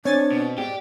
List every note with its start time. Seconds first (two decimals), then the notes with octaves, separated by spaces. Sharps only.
0.05 C4 D4 C#5 G#5 A6
0.32 B2
0.58 G#2 G4 D5